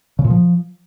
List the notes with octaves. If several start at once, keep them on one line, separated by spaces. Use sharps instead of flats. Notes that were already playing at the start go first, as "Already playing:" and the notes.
C#3
A#2
F3